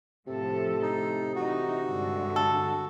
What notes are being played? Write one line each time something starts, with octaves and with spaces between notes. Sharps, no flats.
A2 C3 F3 A4
D#4
E3 D#4 F#4
G2 D3 G#3
A4